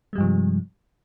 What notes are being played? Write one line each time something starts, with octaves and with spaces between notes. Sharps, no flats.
G2 C3 F3 G3 G#3